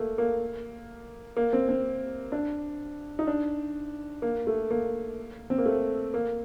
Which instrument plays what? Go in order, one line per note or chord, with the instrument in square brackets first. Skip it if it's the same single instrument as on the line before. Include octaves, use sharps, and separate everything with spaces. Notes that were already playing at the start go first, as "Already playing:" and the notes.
Already playing: [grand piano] A3 A#3
A#3
A#3
C4
C4
D4
D#4
D4
A#3
A3
A#3
C4
A#3
A3
A#3